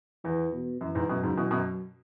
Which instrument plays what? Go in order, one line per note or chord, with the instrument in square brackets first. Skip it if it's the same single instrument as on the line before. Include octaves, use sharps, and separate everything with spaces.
[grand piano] E2 [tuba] E3
[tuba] B2
[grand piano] F#2 [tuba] E3
[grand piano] E2 G#2
[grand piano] F#2 B2 [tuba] F#3
[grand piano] G#2 C#3
B2 E3
F#2 B2